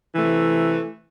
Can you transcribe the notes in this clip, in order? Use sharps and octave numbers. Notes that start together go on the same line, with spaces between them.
C3 E3 A3